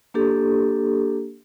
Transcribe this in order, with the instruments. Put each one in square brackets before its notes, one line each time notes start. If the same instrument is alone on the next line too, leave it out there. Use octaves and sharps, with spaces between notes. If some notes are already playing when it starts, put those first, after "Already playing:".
[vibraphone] A#3 D4 G4 A4